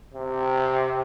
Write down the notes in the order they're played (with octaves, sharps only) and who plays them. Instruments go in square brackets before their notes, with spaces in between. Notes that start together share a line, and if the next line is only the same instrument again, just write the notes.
[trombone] C3